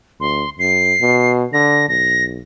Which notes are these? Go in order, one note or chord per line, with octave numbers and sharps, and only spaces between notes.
D2 C6
F#2 C7
B2
D3 A#6
B1 A#6